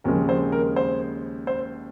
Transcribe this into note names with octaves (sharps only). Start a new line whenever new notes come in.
D#2 C#3 F3 G#3 A#4
C5
A#4
C5
C5